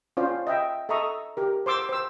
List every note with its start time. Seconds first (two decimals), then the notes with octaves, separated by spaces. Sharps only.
0.17 C#4 F4 C5 D5
0.47 D#5 E5 G5
0.89 A4 D#5 E5 A#5 C#6 D#6
1.37 G4 A#4
1.66 C5 C6 D6 E6
1.89 C5 E6